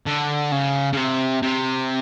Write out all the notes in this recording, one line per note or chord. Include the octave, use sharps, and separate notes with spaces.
D3
C#3
C#3
C3
C3